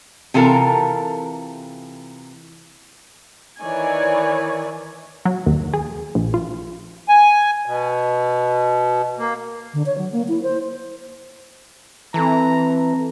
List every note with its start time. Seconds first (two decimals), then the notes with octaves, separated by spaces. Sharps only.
0.34 C3 E3 F4 A4 A#4
3.60 D#3 E3 C#5 D5 G#5
5.25 F#3
5.46 D#2
5.74 G#4
6.15 A#1
6.34 F4
7.09 G#5
7.66 B2
9.18 A#3
9.74 D3
9.86 C#5
9.98 F#3
10.12 A#3
10.28 E4
10.43 C5
12.14 E3 C4 A4 A5 A#5